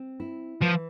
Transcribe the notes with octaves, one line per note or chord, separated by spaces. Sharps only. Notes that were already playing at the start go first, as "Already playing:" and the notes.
Already playing: C4
E4
E3 F3